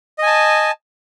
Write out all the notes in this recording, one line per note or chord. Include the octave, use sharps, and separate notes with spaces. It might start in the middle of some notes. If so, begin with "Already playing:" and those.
D#5 G#5 A5